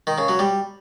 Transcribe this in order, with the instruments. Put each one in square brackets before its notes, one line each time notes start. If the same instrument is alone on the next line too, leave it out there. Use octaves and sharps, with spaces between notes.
[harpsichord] D#3
C#3
F#3
G3